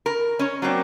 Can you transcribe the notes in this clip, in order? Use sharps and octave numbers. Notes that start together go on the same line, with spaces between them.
A#4
C#4 C#5
F#3 A#3 C4 D4